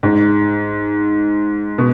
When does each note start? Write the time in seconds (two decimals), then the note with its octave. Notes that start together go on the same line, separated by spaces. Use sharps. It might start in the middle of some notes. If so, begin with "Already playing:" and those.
0.03 G#2
1.78 B2